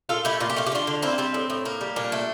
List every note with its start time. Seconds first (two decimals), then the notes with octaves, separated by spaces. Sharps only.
0.09 A#2 F4 A4
0.25 A3 E4 G4
0.40 A#2 F4
0.50 G4
0.56 A3 F4
0.66 G4
0.72 D3 D4 F4
0.87 D3
1.02 A#3 C4 E4
1.18 G3 C4
1.34 A2
1.50 A2
1.65 A#3
1.81 G3
1.96 A#2 D4
2.12 A3